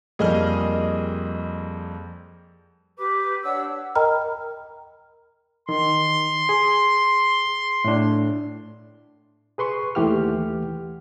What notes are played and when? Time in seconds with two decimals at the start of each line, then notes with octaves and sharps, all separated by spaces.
0.19 F2 G3 A#3 G#4 D#5 F6
2.97 G4 B4 D6
3.43 D4 C#5 F#5 E6
3.95 A#4 D#5 G5 A#5 B5 F6
5.69 D#3 C6
6.49 G#4
7.84 A2 D4
9.58 G#4 B4 C6 C#6
9.95 D#2 E3 A3 G4 F#5 F6